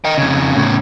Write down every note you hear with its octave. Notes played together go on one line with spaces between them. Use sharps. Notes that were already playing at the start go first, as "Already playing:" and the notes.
D#5 G5
F2 C#3
A2 C#3